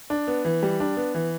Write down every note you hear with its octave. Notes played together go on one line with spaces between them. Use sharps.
D4
B3
E3
G3
D4
B3
E3